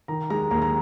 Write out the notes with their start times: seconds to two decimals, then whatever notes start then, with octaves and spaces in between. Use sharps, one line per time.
0.08 D#3 A#5
0.30 G#3 A#5
0.51 D#2 A#5
0.62 A#5